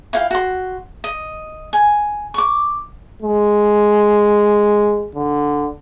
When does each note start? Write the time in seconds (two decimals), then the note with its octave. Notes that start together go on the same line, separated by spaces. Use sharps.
0.13 E4 F4 F5 G5
0.31 F#4 C6
1.04 D#5
1.73 G#5
2.34 C#6 D6
3.22 G#3
5.15 D3